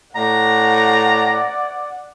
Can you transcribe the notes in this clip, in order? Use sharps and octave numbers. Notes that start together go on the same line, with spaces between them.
A2 D5 F#5 A#5